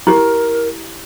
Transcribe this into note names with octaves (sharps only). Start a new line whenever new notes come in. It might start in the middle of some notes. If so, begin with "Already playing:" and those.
E4 G4 A#4